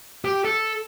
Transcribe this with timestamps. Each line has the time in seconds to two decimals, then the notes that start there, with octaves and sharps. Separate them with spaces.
0.25 G4
0.45 A4